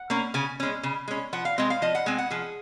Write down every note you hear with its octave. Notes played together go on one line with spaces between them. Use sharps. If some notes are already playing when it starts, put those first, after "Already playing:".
Already playing: F#5
A#3 C#4
C#3 G#5
G#3 C#4
C#3
G#3 C#4
F3 F#5
F5
G#3 C4 D#5
F5
F3 D#5
F#5
G#3 C4 G#5
F#5
F3 G#4